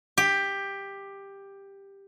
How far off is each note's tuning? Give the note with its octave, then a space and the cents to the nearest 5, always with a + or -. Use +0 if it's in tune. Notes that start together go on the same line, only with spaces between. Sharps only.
G4 +10